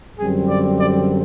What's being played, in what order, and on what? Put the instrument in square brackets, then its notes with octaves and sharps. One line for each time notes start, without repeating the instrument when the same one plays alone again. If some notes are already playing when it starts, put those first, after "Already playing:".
[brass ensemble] F#2 D3 G3 C4 G#4
D5
D5